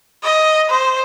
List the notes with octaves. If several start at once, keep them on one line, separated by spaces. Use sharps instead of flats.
D#5
C5